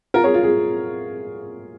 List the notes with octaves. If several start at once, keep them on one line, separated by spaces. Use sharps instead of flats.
F4 A#4
G#4 C#5
F4
G#4